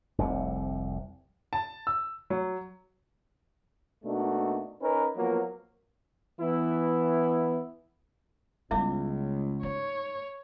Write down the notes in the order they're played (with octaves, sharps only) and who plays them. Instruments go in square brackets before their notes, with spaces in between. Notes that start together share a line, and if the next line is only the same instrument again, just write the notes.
[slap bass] F1 C2 C3
[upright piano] A5
E6
F#3
[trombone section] B2 A3 A#3 D4 D#4 F#4
C#4 D#4 A#4 B4
F3 F#3 A#3 B3 A#4
E3 B3 E4
[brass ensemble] C#2 [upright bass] G3 B3 [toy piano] E4 E5 D6
[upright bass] D#4 [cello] C#5